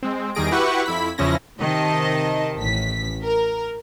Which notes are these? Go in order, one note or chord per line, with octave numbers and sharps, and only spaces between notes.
G#3 C4
E2 D#3 G3 G#4 A#6 D7
E4 F#4 G4 B4 F#5 C#6
F2 E4 B5 B6
E2 C#3 F3 C#4 E4 A#6
C3 D#3 D#5 A5
A1 A2 B6
A#4